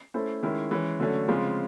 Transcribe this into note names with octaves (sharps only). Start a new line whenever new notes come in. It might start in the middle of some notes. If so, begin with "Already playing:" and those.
A3 C#4 E4 A4 C5
D#3 G#3 C#4 E4
E3 G#3 C#4
D3 F#3 A3 C#4
C#3 F3 G#3 C4 F4